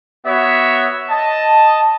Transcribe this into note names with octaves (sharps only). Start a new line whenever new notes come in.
B3 F#4 C#5 E5
D#5 A5